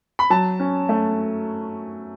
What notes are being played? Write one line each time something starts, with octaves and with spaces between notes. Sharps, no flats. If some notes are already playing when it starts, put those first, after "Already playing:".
B5
F#3 A5
C#4
A3